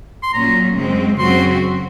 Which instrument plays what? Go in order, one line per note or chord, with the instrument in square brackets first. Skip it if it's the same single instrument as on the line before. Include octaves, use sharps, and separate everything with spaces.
[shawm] C6
[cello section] A#2 F#3 C#4 [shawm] A#5
[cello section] F#2 C#3 G#3 C4
[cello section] F#2 C#3 F#3 C4 F#4 [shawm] C6